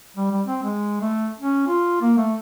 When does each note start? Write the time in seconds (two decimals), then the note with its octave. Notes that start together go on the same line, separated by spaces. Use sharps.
0.17 G3
0.31 G3
0.47 C4
0.63 G#3
1.01 A3
1.39 C#4
1.68 F4
2.01 A#3
2.18 A3